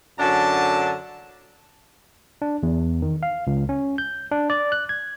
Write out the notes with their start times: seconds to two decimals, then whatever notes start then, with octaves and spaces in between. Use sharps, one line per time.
0.19 F#2 D3 F#3 D4 A5
2.42 D4
2.63 E2
3.02 D#3
3.23 F5
3.47 C#2
3.69 C#4
3.98 G6
4.32 D4
4.50 D5
4.72 F#6
4.89 G#6